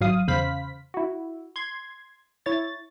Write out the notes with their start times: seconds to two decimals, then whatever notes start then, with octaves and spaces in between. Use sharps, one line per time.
0.01 G#1 F#3 F5 D#6
0.28 E2 C#3 C5 F5 B5 B6
0.94 E4 F#4
1.56 C6 G#6
2.46 E4 C#5 A6